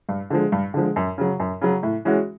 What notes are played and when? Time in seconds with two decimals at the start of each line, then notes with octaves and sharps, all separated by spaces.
0.09 G2
0.30 D3 F3 G#3
0.52 G2
0.74 D3 F3 G#3
0.96 F#2
1.18 C#3 F#3
1.40 F#2
1.62 C#3 F#3
1.83 A2
2.05 E3 G#3 C#4 F#4